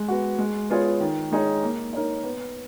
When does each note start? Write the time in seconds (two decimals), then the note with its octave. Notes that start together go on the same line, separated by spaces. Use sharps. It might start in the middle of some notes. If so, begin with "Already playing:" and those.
Already playing: G#3
0.08 B3 F#4
0.38 G#3
0.70 B3 F4 G#4 C#5
1.00 D#3
1.31 G#3 D#4 G#4 C#5
1.63 A#3
1.93 D#4 A#4 C#5
2.24 B3